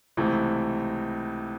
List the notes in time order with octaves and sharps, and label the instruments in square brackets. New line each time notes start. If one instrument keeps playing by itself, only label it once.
[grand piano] C#2 C3 E3 A3